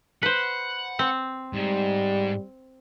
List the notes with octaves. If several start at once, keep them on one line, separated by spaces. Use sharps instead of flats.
B4 C5 F#5
C4
G#2 G3